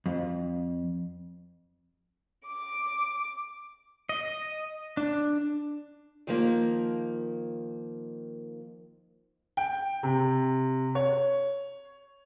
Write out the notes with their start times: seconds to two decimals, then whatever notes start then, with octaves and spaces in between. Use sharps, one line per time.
0.06 F2
2.46 D6
4.09 D#5
4.97 D4
6.27 D#3 F3 A#3
9.57 G5
10.03 C3
10.95 C#5